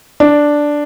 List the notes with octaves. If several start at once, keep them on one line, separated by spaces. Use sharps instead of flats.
D4